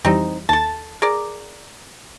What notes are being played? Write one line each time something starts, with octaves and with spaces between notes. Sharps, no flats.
F2 E3 G3 C4 D#4
D#2 A4 A5
G#4 A#4 D5